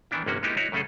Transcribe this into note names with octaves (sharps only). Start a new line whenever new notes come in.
D#3 E3 B3 D4 E4
G1 C3 A#3 C#4 F#4
G#3 A#3 B3 D#4 E4 G4
D#4 E4 F#4 C#5
F#2 C#3 A3 C#4 G#4 A4